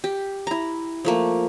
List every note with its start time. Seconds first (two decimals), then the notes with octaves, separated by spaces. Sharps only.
0.04 G4
0.47 E4 A#5
1.05 F3 A3 A#3